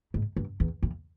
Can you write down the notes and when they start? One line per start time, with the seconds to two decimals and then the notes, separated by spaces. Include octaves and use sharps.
0.14 G#2
0.37 G2
0.60 E2
0.83 F2